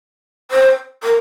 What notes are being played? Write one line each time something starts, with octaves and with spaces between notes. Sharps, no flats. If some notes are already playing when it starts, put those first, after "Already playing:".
C5
A#4